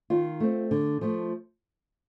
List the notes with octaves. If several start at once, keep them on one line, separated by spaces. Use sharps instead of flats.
D#3 F4
A3 C4
D3
F3 A3